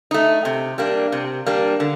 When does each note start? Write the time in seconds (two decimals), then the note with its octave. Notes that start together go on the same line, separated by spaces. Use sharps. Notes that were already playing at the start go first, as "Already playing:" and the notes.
0.11 A3 D#4
0.45 C3
0.78 G3 A#3 D4
1.12 C3
1.46 G3 A#3 D4
1.80 D3